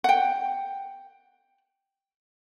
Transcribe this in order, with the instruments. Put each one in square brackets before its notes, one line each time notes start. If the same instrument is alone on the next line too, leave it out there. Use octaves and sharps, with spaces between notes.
[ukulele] F#5 G5